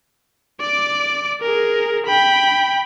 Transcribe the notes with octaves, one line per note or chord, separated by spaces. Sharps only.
D5 D6
G#4 A#4
G5 B5